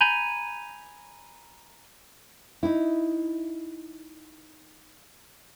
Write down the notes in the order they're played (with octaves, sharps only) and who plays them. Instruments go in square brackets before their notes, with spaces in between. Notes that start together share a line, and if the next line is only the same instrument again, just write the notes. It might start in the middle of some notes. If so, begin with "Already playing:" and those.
[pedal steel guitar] G#5 A#5 B5 G6
[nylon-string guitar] D#4 E4